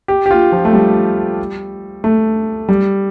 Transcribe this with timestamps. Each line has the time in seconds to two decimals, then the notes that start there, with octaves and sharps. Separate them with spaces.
0.08 G4
0.26 G4
0.31 F4
0.52 F3
0.65 A3
0.73 G3
2.04 A3
2.69 G3